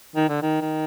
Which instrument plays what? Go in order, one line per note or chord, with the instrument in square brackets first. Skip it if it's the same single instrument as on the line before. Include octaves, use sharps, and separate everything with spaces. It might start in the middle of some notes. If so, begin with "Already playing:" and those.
[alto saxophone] D#3
D3
D#3
D#3